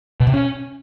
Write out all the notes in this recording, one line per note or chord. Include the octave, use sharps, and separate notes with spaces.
B2
C3
C#4